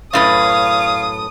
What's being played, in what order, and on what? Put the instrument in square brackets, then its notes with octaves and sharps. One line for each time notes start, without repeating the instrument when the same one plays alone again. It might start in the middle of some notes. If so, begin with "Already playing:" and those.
[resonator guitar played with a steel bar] F#2 A2 B4 [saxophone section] C#5 F5 [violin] D#6